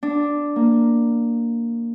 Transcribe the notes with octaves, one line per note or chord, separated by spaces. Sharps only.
D4
A#3